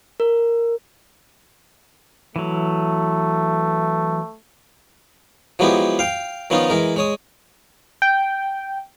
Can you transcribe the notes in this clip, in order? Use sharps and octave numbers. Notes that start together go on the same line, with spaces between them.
A#4
E3 F#3 A3
F3 F#3 G#3 B3 E4 G4
F5 G5
D#3 F3 B3 C#4 D#4 F4
E3 G#3 A#4
G#3 C#5 D#6
G5